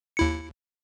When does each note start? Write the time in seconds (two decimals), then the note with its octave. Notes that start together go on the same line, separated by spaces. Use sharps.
0.17 D#2 E4 C#7